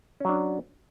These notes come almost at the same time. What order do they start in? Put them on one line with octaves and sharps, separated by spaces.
C#4 F#3 D4